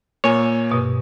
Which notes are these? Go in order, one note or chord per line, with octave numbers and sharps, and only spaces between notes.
A#2 A#3 C#5 G#5
G2 B2 C#6